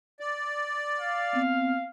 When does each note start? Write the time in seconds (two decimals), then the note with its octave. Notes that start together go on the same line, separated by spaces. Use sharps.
0.20 D5
1.00 F5
1.33 B3 C4